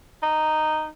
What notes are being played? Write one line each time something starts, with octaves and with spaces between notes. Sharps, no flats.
D#4